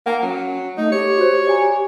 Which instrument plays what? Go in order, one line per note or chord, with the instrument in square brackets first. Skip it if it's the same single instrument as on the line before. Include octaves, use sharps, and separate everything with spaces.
[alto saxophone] A#3 [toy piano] F#5 G5 A#5
[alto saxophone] F#3 [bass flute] C#4
[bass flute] A3 [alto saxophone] D#4
[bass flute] G4 [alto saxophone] C#5
[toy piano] F#4 C5
D5 G#5 A#5